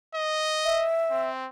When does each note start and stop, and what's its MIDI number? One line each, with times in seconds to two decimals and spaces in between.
0.15 0.88 75
0.65 1.29 76
1.11 1.48 60